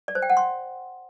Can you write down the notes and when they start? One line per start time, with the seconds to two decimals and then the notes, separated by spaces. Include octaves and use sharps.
0.08 D5
0.15 C5
0.22 G5
0.30 F#5
0.37 C6